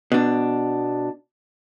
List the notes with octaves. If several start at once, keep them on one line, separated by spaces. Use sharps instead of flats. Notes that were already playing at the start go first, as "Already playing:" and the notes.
B2 D4